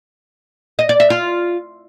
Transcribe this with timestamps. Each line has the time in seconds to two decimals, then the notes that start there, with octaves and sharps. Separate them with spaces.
0.79 D#5
0.89 D5
1.00 E5
1.10 F4